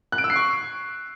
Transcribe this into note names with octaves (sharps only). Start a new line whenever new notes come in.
F#6
D7
E6
C7
C#6